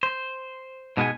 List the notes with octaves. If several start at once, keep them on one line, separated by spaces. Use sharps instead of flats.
C5
G#2 B2 G#3 B3 G#4 G#5